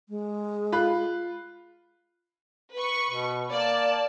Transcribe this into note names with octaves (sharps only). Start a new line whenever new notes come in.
G#3
F4 B5 F#6
B4 C#6
B2
A#3 D5 A5